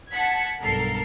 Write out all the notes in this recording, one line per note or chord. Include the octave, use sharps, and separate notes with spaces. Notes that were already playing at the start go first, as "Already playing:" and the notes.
F#5 A5 G#6 B6 C#7
B1 G2 A4 A#4 C7